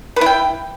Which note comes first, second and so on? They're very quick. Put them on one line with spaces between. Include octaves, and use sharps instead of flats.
B4 E4 G5